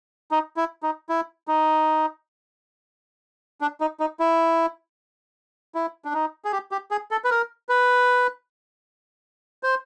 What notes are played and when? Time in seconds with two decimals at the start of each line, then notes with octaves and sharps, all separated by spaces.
0.31 D#4
0.57 E4
0.83 D#4
1.09 E4
1.48 D#4
3.61 D4
3.80 D#4
4.00 D#4
4.20 E4
5.75 E4
6.05 D4
6.14 D#4
6.45 G#4
6.52 G4
6.71 G4
6.91 G#4
7.11 A4
7.24 B4
7.30 A#4
7.69 B4
9.63 C5